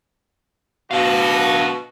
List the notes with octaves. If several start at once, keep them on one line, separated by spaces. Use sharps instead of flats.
B2 D4 F#4 F5